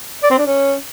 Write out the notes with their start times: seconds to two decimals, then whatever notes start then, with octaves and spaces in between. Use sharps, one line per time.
0.23 D5
0.31 C4
0.39 D4
0.46 C#4